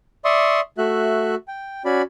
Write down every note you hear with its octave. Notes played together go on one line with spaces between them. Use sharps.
D5 E5 C6 C#6 D#6
A3 F#4 E5 F#6
G5
C#4 F#4 D5 B5